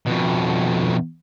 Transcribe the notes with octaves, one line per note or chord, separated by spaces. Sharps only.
F2 B2